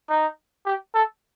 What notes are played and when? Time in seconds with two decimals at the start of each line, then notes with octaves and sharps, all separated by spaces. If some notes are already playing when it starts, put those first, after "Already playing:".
0.09 D#4
0.66 G4
0.94 A4